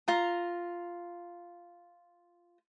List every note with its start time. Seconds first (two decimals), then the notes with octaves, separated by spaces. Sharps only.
0.08 F4 A#5